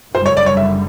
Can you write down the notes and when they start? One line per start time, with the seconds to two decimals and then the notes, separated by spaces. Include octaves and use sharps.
0.15 F#1 F#2 D3 G3 C5
0.26 C#5
0.37 D5
0.46 C#5
0.57 E5